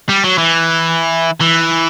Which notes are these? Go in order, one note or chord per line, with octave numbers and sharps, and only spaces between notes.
G3
F#3
E3
E3